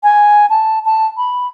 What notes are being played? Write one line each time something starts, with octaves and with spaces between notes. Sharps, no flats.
G#5
A5
A5
B5